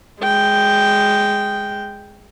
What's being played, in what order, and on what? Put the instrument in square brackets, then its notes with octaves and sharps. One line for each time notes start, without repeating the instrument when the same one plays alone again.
[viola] G#3 G5